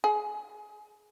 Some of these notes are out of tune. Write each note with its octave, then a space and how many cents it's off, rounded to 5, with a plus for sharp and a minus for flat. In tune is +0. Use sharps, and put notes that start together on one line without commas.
G#4 +15